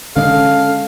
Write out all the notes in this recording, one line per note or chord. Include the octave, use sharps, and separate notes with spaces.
D3 G#3 C#4 A4 F5